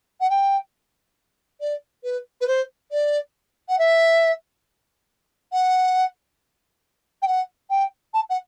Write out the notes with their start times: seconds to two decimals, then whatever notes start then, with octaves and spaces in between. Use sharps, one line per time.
0.20 F#5
0.30 G5
1.60 D5
2.03 B4
2.41 B4
2.47 C5
2.91 D5
3.69 F#5
3.78 E5
5.52 F#5
7.22 G5
7.27 F#5
7.70 G5
8.13 A5
8.29 F#5